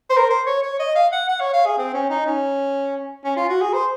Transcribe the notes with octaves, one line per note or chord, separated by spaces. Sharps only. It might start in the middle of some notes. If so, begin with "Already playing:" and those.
C5
A#4
C5
C#5
C#5
D#5
F5
F#5
F#5
C#5
F5
G#4
C4
C#4
D#4
C#4
C#4
F4
F#4
G#4
C5